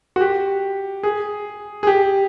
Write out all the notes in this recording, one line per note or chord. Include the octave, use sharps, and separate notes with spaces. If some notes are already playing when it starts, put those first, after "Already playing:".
F#4
G4
G#4
G#4
G4